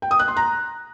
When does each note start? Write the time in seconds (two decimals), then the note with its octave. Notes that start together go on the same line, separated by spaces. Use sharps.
0.02 G5
0.11 D#6
0.19 F#6
0.28 C6
0.37 A#5